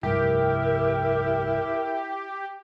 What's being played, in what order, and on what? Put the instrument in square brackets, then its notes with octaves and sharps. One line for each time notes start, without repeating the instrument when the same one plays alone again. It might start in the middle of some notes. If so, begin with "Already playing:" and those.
[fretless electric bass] F1 C2 G2 [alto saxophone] E4 [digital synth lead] G4 [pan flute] A#4